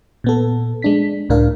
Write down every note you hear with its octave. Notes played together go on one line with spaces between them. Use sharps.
A#2 B3 A4
G#3 D4 B6
C#2 A2 D4 A#4 F5